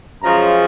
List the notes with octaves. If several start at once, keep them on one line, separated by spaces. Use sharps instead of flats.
F#2 C#3 F3 G#3 A#5